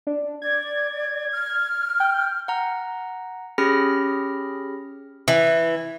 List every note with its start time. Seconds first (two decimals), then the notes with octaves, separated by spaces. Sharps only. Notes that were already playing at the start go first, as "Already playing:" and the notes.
0.07 D4
0.42 D5 G#6
1.32 F6
2.00 G5
2.48 F#5 A#5
3.58 C#4 G4 G#4 B5 F6 A#6
5.28 E3